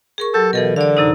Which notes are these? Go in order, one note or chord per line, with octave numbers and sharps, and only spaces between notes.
G#4 A#4 C#6
F#3 G4 A4
B2 E3 A4 A#4
D3 D5 F5
F#2 C3 D#4